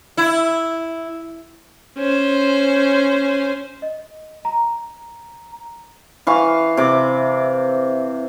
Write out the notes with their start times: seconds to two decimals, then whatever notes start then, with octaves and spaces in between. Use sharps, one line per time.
0.17 E4
1.98 C#4 C5
3.82 D#5
4.45 A#5
6.27 E3 F5 C#6
6.77 C3 D6